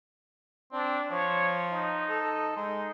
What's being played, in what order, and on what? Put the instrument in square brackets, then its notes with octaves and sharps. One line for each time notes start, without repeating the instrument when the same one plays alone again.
[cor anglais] C4 [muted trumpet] D4
[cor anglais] F3 [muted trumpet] C#5
[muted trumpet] D#4
[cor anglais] A4
[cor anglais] G#3 [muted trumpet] D#4